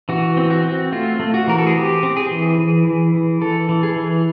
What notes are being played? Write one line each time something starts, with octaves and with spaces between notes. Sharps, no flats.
E3 F#4
C4
F#4
C4
A3 F4
A3
F#4
E3 A#4
A4
G#4
C4 G4
C4
G#4
E3
E3
E3
E3
E3 A4
E3
G#4
E3